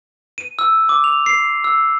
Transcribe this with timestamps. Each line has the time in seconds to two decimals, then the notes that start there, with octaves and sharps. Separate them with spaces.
0.38 D#7
0.59 E6
0.89 D6
1.04 F7
1.26 C7
1.64 E6